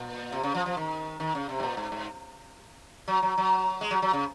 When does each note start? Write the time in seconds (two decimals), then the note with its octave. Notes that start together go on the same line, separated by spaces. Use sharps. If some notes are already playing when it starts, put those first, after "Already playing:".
Already playing: A#2
0.32 C3
0.43 C#3
0.55 F3
0.66 F3
0.77 D#3
1.20 D#3
1.35 C#3
1.49 C3
1.60 G#2
1.63 A#2
1.77 G#2
1.92 G#2
3.08 F#3
3.22 F#3
3.38 F#3
3.81 G#3
3.91 F#3
4.02 F#3
4.13 C#3